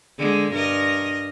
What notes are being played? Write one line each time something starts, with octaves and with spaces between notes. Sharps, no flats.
D3 G#3
G2 A#4 D#5